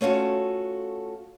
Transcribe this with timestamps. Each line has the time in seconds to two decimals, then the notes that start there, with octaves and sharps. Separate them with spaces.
0.01 A3 C#4 F4 F#4 A4